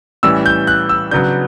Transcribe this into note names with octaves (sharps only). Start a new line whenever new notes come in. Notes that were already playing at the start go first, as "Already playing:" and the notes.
A2 E3 G3 C#4 E6
G6
F#6
E6
C#3 F#3 B3 D4 G6